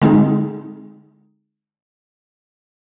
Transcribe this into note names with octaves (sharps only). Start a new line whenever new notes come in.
D3 G#3 C4 D#4 G#4